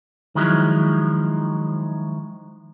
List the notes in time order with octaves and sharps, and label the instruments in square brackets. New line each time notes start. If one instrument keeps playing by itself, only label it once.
[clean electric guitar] D#3 F3 F#3 G#3 E4